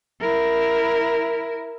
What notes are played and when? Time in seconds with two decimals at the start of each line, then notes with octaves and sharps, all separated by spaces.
0.21 E4 A#4